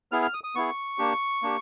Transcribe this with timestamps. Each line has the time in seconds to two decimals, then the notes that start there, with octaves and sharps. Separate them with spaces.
0.12 B3 E4 G#4 F6
0.22 F6
0.34 D#6
0.44 D#6
0.55 B3 E4 G#4 C#6
0.98 A#3 D4 G4
1.42 A#3 D4 G4